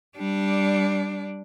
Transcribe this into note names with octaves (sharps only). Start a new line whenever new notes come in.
G3 D4